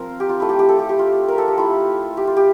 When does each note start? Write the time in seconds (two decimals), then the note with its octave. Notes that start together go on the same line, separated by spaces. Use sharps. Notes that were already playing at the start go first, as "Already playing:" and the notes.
Already playing: F3 C4 F4 A#4 C5
0.20 G4
0.29 F4
0.40 A3 E4
0.49 G4
0.59 G4
0.69 A4
0.79 G4
0.89 G4
0.99 F4
1.28 A#4
1.38 A4
1.48 G4
1.58 A3 E4 F4
2.17 G4
2.27 F4
2.37 G4